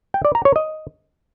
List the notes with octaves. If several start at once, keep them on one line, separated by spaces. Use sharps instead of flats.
G5
D5
A#5
C#5
D#5